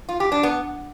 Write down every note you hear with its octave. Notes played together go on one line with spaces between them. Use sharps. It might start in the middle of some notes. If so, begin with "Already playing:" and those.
F4
G4
D4
B3